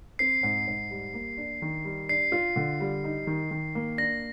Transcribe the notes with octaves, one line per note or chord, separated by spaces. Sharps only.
C4 C7
G#2
G#2
G3
A#3
D4
D#3
G3
D4 C7
F4
D3
G3
D#4
D#3
D#3
A#3
D4 A#6